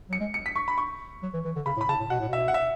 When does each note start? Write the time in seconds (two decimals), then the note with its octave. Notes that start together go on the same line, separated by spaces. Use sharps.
0.09 F#3 C#7
0.20 G#3
0.34 C#7
0.46 B6
0.56 C#6
0.68 B5
0.78 C#6
1.23 F#3
1.34 E3
1.45 E3
1.56 D3
1.66 C#3 B5
1.77 A2
1.81 B5
1.88 C#3 A5
2.00 A2
2.10 B2 F#5
2.20 A2
2.28 B2 E5
2.48 F#5
2.54 E5